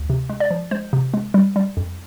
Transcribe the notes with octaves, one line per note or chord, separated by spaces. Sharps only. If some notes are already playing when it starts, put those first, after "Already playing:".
Already playing: D2
C3
G#3
D5
F3
G#3 C5
C3
G#3
G3
G3
F2